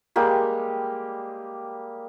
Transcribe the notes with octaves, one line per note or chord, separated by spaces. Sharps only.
G3 G#3 A#3 G4